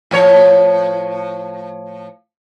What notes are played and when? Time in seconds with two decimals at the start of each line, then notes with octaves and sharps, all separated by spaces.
0.11 A2 F3 C#5